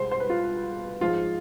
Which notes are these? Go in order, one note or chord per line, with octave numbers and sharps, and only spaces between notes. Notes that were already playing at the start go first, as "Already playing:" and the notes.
Already playing: C2 B2 G#3 C5
C5
B4
F4
G#2 F3 G#3 F4